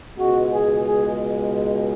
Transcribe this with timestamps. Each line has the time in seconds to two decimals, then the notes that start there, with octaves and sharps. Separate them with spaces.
0.17 C#2 B2 G#3 F#4
0.51 G#4
0.85 G#4